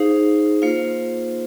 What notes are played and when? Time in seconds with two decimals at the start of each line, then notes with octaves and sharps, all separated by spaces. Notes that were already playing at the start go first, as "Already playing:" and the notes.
Already playing: D#4 G#4 C5 F5
0.62 A#3 F4 C5 F5